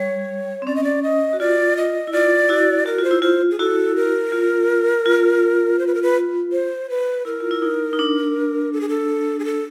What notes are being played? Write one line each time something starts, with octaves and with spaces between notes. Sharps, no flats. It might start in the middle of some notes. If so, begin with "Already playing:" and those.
Already playing: G3 C#5
C4
C#4 D5
D#5
D5
D#5
F#4
F4 D5
D#5
E4
F4 D5
E4 F#4
F#4 A#4
F4
C5
E4
F4 C5
G#4
E4 F#4 A4
A#4
F4
F4
C5
B4
A#4
B4
C5
B4
E4 A#4
F4
E4
D#4
D#4
D4
A4
G#4
A4
G#4
A4